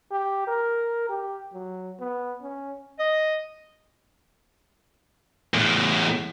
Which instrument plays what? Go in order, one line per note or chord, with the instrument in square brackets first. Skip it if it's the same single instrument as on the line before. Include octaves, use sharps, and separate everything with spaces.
[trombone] G4
A#4
G4
F#3
B3
C#4
[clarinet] D#5
[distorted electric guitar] E2 A2